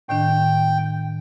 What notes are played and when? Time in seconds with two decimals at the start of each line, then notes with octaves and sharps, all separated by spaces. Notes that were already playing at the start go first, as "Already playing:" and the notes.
0.09 A2 D#3 D4 G5